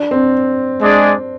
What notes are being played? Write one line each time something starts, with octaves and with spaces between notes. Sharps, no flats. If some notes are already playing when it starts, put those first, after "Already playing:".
Already playing: D4
C4
G#3 D4 G#4 D5